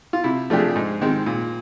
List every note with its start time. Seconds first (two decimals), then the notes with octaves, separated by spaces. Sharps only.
0.13 F4
0.24 C3 E4
0.50 F3 A3 D4 G4
0.59 G#4
0.76 G#2
1.01 D#3 G#3 C4
1.26 A#2